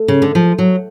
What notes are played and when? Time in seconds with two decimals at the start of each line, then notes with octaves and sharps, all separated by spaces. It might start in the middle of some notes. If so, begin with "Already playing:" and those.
Already playing: A3
0.08 C#3
0.22 D3
0.35 F3
0.58 F#3